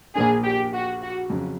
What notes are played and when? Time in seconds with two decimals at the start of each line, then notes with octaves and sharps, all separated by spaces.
0.15 A#1 A#2 F3 A#3 D4 G#4
0.44 G4
0.73 F#4
1.01 F#4
1.30 F2 C#3 F#3